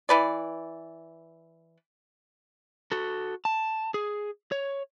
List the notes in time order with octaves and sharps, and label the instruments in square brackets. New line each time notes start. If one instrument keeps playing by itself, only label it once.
[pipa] E3 B4 D5
[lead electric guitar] F#4 A4
A5
G#4
C#5